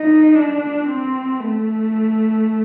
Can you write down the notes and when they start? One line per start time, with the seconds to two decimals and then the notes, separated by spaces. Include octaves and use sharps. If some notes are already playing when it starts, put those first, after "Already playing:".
Already playing: D#4
0.35 D4
0.88 C4
1.40 A3